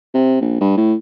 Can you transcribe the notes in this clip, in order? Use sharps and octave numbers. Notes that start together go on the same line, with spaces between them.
C3
A#1
G2
A2